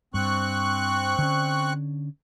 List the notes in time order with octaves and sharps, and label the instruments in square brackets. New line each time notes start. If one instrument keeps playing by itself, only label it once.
[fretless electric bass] G2 [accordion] C4 C#6 F#6
[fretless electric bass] D3 C#4